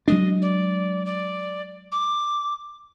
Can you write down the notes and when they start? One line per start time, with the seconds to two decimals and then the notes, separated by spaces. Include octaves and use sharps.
0.08 F#3 G#3 D4 D#5
0.42 D5
1.05 D5
1.92 D6